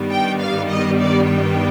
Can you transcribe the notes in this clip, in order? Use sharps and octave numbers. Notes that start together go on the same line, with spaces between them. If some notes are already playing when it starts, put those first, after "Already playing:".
Already playing: G2 D#3 G3 B3
G5
F5
D#5
D5
G5